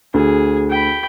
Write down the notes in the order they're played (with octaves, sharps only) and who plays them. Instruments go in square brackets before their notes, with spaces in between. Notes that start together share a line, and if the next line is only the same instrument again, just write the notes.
[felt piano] D2 [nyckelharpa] G#4
[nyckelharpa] G5 B5